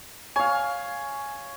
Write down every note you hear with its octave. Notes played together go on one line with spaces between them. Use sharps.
C#5 F5 G#5